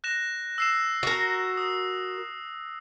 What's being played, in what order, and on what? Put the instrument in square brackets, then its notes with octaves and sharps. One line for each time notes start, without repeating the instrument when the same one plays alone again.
[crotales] F#6 A#6 E7
E6 C7 E7
[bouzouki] F#4 A#4
[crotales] D#6